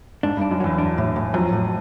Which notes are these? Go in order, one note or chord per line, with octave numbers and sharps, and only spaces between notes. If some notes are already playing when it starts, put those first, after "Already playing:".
G#2 D4
G2
D4
F#2
E2 F#3
D4
A2
A2
F2 F#3
A2